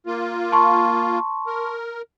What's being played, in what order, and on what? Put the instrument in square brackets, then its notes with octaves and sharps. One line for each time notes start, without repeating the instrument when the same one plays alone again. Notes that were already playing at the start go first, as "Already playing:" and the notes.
[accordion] A#3 F4
[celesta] A5 C6 C#6
[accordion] A#4